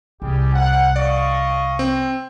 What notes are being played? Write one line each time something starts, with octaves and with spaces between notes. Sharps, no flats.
C2 G3 G4 G#4
F#5
D5 D#5 F5 C#6
C4